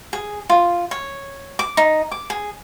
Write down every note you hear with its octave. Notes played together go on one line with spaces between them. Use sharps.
G#4
F4
C#5
D6
D#4
D6
G#4